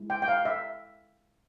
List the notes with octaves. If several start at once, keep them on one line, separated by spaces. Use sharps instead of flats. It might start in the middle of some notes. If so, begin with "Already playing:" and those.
Already playing: G#3 E4
G5
G5
F5
E5